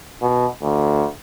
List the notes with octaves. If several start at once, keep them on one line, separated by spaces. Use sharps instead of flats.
B2
D2